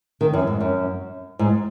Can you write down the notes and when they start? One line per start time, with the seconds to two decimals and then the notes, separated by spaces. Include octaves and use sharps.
0.21 D#3
0.34 F#2
0.47 G#2
0.60 F#2
1.39 G#2